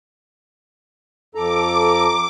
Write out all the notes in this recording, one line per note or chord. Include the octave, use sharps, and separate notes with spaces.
F2 A4 A#5 D6